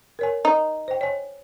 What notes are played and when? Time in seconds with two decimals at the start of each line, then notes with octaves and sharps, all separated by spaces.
0.19 A#4 C#5 G#5
0.45 D#4
0.88 C5 G5
1.01 C#5 G#5